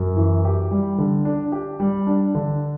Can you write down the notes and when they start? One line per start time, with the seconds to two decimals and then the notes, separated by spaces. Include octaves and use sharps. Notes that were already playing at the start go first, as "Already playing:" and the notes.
Already playing: F#2
0.16 E3
0.45 G4
0.71 G3
0.98 D3
1.25 D4
1.52 G4
1.80 G3
2.07 D4
2.35 D3